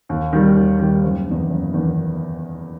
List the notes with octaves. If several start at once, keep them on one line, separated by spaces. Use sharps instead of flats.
D#2
D#3 G3
D#2
D#3 G3
F#1
E2 D#3
F#1
E2 D#3